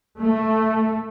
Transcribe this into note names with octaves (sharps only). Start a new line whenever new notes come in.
A3